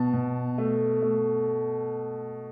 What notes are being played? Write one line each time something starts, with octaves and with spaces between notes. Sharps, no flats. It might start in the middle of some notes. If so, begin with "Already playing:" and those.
Already playing: B2 A5
B2
A3
A3